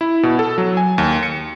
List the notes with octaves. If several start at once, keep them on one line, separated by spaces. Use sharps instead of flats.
E4
B2
A4
F#3
G#5
D#2
C#7